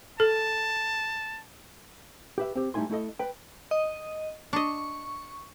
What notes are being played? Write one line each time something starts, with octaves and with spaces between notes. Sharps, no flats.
A4 A5
G4 B4 E5
C4 G4
G3 A3 D#4 E4 G#5 C6
A3 E4 A4 D#5
B4 G5
D#5
D4 D#5 C#6